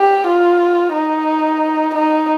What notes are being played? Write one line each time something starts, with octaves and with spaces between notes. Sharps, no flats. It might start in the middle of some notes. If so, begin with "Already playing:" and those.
Already playing: G4
F4
D#4
D#4